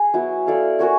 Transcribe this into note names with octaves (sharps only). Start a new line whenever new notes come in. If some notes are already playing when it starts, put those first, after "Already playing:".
Already playing: G#4
F#3 B3 E4
E4 A4 D5 F5
C#4 F#4 A#4 C#5